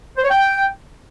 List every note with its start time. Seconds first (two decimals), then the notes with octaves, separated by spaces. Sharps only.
0.17 C5
0.23 C#5
0.29 G5